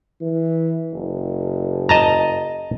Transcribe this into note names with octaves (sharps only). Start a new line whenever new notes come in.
E3
F#1
D#5 A5 A#5